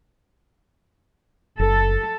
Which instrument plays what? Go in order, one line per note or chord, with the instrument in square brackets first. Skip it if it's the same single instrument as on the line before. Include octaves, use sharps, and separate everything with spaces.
[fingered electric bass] F#1 [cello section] A4